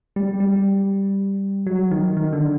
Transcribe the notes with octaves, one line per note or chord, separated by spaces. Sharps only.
G3
G3
F#3
D#3
D#3
D3